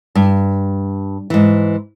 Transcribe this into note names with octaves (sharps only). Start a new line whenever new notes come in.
G2
G#2 E3